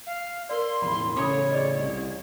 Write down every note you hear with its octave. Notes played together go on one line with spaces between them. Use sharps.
F5
A#4 D5 C6
E1 A1 B5
A1 C#3 C#4 A4 C#5 B5 D6
G#4 D5 D#5
C2